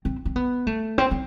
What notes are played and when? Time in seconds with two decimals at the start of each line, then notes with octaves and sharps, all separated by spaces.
0.05 C4
0.25 C4
0.36 B3
0.67 A3
0.98 C4
1.11 C4